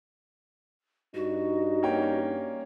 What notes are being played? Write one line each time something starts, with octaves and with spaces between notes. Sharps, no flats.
G2 D#4 F#4
A#3 C#4 G5